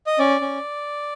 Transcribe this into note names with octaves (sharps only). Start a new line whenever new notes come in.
D#5
C#4 D5
C#4